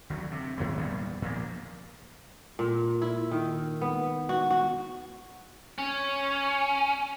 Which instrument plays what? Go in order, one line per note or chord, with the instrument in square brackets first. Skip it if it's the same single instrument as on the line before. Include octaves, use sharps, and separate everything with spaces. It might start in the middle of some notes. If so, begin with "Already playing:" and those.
[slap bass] D2 D3 F#3
C3
G#2 C3 F#3 G#3
E2 A#2 G3 B3
A#2 F3 A#3
[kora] A#2
E4
D#3
B3
F#4
F#4
[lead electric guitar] C#4